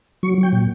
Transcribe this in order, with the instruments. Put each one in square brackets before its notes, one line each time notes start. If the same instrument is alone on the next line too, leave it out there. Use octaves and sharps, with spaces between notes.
[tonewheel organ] F#3 C#6
F#3 G5
A#2